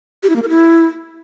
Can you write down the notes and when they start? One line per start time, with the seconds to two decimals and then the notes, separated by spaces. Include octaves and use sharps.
0.23 G4
0.30 E4
0.36 A#3
0.43 A#4
0.49 E4